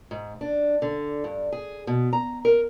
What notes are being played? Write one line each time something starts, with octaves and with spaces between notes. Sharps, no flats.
G#2
D4
D3
G2
G#4
B2
A#5
A#4